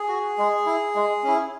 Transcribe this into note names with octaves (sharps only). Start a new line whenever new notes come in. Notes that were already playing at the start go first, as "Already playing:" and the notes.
Already playing: G#4
F#4
G#3
E4
G#3
C#4 E4